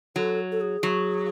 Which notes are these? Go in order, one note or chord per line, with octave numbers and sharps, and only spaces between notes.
F#3 A4
A4
G#4
F#3